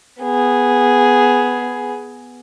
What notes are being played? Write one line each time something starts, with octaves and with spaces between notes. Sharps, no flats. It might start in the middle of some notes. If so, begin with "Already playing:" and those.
B3 G#4